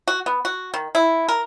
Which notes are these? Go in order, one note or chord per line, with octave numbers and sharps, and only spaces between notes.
F#4
B3
F#4
D#3
E4
A#4